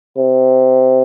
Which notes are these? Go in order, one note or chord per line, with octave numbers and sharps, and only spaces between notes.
C3